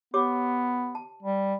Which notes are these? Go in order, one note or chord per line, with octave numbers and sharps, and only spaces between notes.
B3 G4 C#5 D6
A5
G3